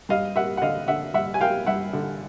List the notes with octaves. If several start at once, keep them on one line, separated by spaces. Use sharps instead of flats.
G2 D#5 F5
A#3 E5 F#5
F#5
D3 D#5 F5
D3 E5 F#5
G2 E5 F#5
G#5
A#3 F5 G5
G2 E5 F#5
D3